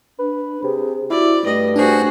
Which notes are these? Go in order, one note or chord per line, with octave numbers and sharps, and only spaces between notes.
D4 B4
C3 G#4
E4 F#4 D5
G2 A3 D#5
D4 F#4 G#4 C5